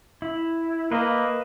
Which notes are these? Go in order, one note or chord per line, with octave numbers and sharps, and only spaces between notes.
E4
A#3 B4 D#5 E5